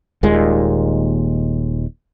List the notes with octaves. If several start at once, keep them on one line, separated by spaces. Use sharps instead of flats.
D#1 D#2 A#2 G#3